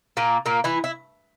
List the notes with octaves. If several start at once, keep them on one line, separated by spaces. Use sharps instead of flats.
A#2 A#3
A#2 A#3
E3 E4
E4